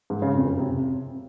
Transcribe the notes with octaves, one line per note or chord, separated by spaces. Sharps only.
G#2
C#3
F2
F#2
C3